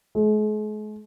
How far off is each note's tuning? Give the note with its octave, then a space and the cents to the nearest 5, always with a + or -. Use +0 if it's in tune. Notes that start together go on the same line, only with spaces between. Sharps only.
G#3 +45